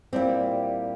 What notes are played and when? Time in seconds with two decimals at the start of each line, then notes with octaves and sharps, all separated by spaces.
0.13 A#2 G3 C4 E4 G4